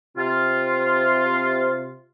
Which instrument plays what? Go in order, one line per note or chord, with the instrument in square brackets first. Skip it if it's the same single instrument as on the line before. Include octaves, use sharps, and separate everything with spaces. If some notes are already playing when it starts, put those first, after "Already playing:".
[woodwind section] C3 F4